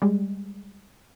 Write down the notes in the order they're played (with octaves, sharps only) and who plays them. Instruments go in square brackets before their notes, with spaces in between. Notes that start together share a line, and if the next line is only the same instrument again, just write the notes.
[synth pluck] G3 G#3